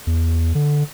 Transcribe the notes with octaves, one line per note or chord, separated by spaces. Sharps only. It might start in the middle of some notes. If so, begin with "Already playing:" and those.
E2
D3